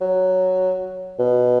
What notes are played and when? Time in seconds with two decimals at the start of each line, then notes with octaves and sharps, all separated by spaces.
0.01 F#3
1.19 B2